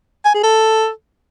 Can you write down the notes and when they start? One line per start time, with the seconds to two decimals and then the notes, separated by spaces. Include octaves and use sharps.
0.25 G#5
0.34 G#4
0.44 A4